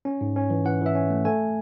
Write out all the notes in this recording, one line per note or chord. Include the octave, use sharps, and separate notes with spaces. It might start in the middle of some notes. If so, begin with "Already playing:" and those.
C#4
G#2
C#4
E3
E3 F#5
E3 E5
C#4
A3
A3 G#5